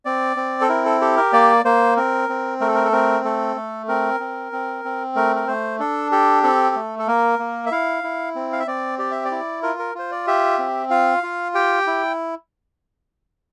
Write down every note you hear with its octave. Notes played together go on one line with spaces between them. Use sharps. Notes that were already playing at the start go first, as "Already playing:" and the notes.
C4 D5
C4
A4
E4 A#4
A4
G4 A4
A#4
A#3 D5
A#3 C5
C4 A#4
C4
A3 A#4
A4
A#4
A4
C4 A#4
A3 A4
A3
C4 A#4
C4
C4
C4
A3 A#4
A#4
A3 C5
D4 A4
G4 A4
C4 A4
A3
A4
A#3 A#4
A#3
E5
E4 F5
E4
C4
F5
E5
C4 D5
G4 D5
E5
D5
E4
F4 A#4
A#4
F4 C5
D5
G4 E5
C4
F4 F5
F4
G4 G5
E4